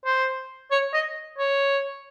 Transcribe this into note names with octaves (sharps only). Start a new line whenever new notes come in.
C5
C#5
D#5
C#5